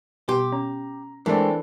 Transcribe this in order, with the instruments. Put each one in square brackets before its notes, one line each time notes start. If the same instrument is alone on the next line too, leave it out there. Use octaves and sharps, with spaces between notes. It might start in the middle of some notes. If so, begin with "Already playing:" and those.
[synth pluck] B2 G3 B3 [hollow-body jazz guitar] G4 [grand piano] C6
[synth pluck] C#4 [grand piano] A#5
[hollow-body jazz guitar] E3 [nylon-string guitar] G#3 A3 C4 [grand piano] D4 A4 D5 [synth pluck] A#4